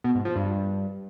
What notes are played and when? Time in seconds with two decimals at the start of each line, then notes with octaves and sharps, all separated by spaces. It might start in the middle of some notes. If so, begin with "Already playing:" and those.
0.04 B2
0.15 G#2
0.25 F3
0.36 G2